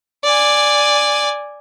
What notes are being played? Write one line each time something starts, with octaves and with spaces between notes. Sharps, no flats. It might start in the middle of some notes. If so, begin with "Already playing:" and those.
D5 G#5